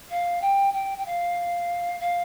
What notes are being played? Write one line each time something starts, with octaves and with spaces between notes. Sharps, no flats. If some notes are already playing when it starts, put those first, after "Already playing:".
F5
G5
G5
G5
F5
F5